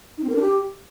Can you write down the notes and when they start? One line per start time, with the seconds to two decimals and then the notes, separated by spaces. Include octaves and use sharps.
0.18 D#4
0.24 C4
0.30 A#4
0.35 D4
0.41 G4